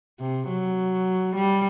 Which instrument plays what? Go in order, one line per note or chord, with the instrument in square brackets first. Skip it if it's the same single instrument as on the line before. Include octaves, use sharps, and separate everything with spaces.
[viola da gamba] C3
F#3
G3